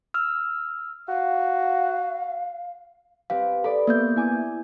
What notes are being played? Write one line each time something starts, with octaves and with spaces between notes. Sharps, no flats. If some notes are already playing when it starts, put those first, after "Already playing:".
E6 F6
F#4 F5
C4 G4 B4 F5
A4 D5 B5
A#3 B3 G6
E4 G#5 D6